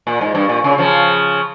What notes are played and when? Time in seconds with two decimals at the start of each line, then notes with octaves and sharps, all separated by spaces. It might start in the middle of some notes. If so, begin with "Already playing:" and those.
0.07 A#2
0.21 G#2
0.35 G2
0.49 A#2
0.64 C#3
0.78 C#3 F3